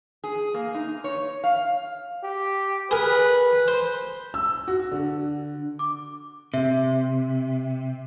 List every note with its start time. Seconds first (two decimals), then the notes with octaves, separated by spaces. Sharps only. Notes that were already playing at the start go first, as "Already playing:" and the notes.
0.24 G#4
0.54 A#3
0.74 D#4
1.04 C#5
1.44 F5
2.24 G4
2.91 G#4 A#4 B4
3.68 C5
4.34 E6
4.68 F#4
4.91 D3
5.79 D6
6.54 C3 E5